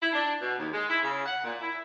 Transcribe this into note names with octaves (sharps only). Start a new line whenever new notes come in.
E4
D4
B2
D#2
G#3
E4
C#3
F#5
A#2
E4